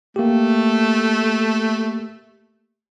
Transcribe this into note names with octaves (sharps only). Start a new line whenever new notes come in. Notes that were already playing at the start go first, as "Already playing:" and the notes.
A3 A#3 G4